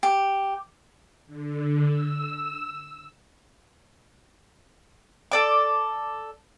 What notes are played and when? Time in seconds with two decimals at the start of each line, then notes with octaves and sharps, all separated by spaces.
0.03 G4
1.27 D3
1.86 E6
5.32 A4 D5 D6